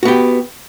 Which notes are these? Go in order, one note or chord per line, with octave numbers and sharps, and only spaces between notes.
B3 F#4 G4